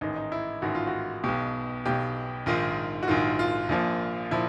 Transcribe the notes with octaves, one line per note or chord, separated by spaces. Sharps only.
A1 G#2 D#3 D#4
D#4
E4
A1 G#2 D#3 F#4
F4
F#4
B1 B2 G4
B1 B2 G4
A#1 G#2 D#3 F4
F#4
A#1 G#2 D#3 F4
F4
A#1 A#2 F3
A#2 F3 E4